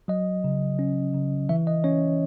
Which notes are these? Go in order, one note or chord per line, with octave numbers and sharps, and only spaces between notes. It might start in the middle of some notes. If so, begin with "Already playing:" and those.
F#3 D#5
C#3
C#4
C#3
E3 E5
D#5
C#4 C#5